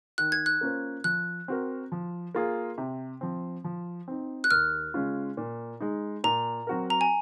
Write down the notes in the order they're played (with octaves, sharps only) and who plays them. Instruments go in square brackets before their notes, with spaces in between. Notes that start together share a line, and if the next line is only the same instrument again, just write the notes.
[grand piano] D#3 [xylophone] F#6
[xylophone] G#6
F#6
[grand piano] A#3 C#4 F4 C5
[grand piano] F3 [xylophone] F#6
[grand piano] C4 F#4 A#4
F3
A#3 F4 G#4
C3
F3 C4
F3
C4 D#4
[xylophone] F#6
[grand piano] D#2 [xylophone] F6
[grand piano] C#3 G#3 C#4 F4
A#2
G#3 D#4
[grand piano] A#2 [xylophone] A#5
[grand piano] F#3 C4 F#4 A#4
[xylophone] A#5
G#5